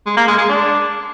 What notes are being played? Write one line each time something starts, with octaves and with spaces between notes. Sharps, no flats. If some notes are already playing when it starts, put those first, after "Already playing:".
G#3
A#3
G#3
G#3
D4